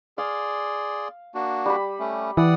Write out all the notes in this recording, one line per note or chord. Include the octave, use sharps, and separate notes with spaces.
G#4 D5 F5 C6
A#3 D4 F#4
G3 B5
A3 C#4
E3 D5 F#5 D#6